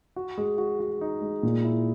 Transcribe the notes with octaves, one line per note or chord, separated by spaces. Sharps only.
F#4
G#3
F#4
F#4
D#4
G#3
A#2
E4